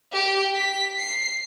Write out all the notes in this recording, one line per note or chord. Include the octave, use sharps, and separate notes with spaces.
G4
B6
C7